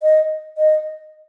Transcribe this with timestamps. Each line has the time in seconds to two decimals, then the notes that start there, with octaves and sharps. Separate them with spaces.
0.02 D#5
0.58 D#5